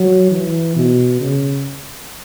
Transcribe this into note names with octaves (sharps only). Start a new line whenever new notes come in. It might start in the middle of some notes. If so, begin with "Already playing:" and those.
Already playing: F#3
E3
B2
C#3